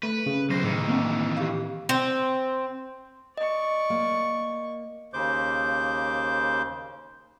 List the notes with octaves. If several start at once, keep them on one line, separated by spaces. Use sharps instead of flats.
A3 B4
C#3
B1 F#3 C5 A#6
A2 D#3 E3
A#3 C4 D4
G4 F5
C4
D5 D#5 C#6
A#3
D#2 C#3 C5 D6 G6